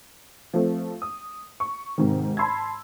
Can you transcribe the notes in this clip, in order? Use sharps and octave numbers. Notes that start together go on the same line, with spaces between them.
F3 A3 C4
D#6
C#6
G#2 C3 D#3
A5 B5 C6 E6 G#6